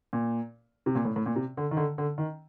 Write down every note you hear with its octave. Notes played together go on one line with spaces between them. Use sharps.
A#2
C3
A#2
A2
A2
A#2
C3
D3
D#3
D3
D3
D#3